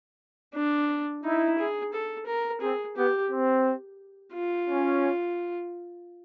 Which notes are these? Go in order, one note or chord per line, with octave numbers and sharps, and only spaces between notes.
D4
D#4 E4
G#4
A4
A#4
C4 G#4
B3 G4
C4
F4
C#4